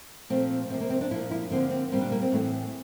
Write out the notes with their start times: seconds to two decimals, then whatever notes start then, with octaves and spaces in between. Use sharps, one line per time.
0.30 A#2 F3 A3 C4
0.70 C3 F3 A#3 C4
0.80 A#3
0.90 C4
1.01 D4
1.11 A#2 F3 A#3 E4
1.31 E4
1.51 D3 F3 A#3 C4
1.71 C4
1.92 A#2 G3 A#3 C4
2.01 D4
2.12 A#3
2.22 C4
2.32 A2 E3 A3